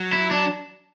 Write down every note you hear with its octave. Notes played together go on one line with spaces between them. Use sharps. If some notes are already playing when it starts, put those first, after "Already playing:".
Already playing: F#3
E4
D4